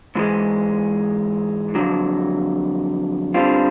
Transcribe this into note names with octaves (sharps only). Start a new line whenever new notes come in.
G#2 E3 G#3
F2 D3 F#3
D3 G3 C4 F4